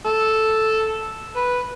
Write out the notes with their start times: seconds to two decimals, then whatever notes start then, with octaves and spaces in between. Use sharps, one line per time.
0.05 A4
1.36 B4